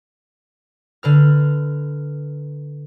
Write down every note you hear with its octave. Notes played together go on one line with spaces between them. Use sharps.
D3 B4 F6